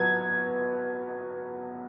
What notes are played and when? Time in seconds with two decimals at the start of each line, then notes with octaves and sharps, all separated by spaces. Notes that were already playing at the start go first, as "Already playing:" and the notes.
Already playing: F#3 B3 G#6